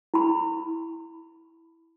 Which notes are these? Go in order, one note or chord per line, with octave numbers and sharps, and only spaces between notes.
E4 B5